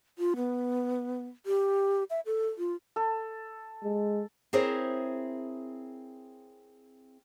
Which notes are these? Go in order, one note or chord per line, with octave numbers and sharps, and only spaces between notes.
F4
B3
G4
E5
A4
F4
A4
G#3
C4 E4 G#4 A#4 C5 C#5